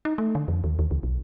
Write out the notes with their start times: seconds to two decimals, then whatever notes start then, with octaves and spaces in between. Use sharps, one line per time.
0.05 D#4
0.18 A3
0.35 D3
0.48 F2
0.64 D#2
0.79 D#2
0.91 C#2
1.03 B1